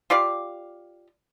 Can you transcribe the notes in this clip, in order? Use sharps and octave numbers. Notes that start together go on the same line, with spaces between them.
F4 G4 D5 F5